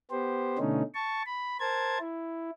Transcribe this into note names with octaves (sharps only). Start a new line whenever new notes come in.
B3 G4 C5
B2 D3 A3 C#4 D#4
A5 C#6
B5
A#4 C5 A5 G#6
E4